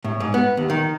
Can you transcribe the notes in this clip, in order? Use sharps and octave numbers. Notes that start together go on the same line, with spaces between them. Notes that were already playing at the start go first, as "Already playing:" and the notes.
A2
G#2
B3
D#2
D#3